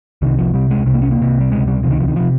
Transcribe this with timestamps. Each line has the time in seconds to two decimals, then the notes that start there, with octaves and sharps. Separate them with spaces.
0.22 C2 C3 D#3
0.38 F3
0.53 C2 C3 G3
0.70 G#3
0.86 C2 C3 G3
0.94 A#3
1.02 C#4
1.11 A#3
1.18 C2 C3
1.40 G3
1.50 C#2 C3 G#3
1.68 G3
1.83 C3 F3
1.87 C#2 D#3
2.00 F3
2.08 D#3
2.16 C3 F3